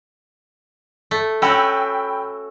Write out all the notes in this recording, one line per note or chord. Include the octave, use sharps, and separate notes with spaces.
A3
C#4 F#4 G5 B5 E6